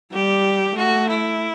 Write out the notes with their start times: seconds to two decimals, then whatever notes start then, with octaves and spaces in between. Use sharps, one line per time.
0.13 G3 G4
0.77 A3 F#4
1.09 E4